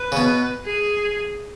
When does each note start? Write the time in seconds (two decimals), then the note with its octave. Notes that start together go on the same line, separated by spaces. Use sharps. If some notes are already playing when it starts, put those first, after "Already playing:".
Already playing: B4
0.12 C#3
0.17 B2
0.66 G#4